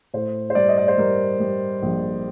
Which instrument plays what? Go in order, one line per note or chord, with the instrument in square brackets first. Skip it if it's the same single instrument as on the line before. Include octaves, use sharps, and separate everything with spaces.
[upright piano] A2 C5
C5
G3 D5
D#5
D5
C5
G3 A#4
G3
A#1